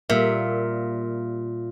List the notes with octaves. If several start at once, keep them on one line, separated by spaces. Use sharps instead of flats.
A#2 G3 A#3 E5